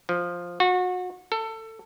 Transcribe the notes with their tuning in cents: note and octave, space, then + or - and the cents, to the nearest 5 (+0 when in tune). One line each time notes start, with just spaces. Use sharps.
F3 +5
F#4 -30
A4 +20